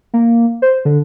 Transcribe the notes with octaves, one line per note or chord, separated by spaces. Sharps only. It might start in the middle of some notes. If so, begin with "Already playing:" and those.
A#3
C5
D3